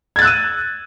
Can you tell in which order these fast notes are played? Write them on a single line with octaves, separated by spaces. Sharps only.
G#6 A6 F#6 E6 D#7